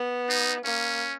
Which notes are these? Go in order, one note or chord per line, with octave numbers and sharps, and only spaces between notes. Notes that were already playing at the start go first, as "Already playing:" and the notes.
Already playing: B3
D#4
A#3 C#4